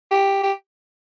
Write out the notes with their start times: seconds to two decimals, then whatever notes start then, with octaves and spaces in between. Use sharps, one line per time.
0.11 G4
0.43 G4